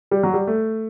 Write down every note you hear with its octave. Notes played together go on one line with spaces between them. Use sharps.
G3
F#3
G3
A3